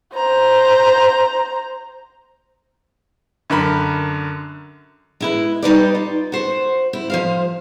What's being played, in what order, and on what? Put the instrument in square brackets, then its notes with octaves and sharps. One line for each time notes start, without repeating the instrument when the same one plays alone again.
[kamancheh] C5 A#5
[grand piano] F#2 D3 A#4 B5
[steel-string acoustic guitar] G#3 E4 B4
G3 D#4 B4 D5
F4
F#4 C5
E4
F3 C5 F5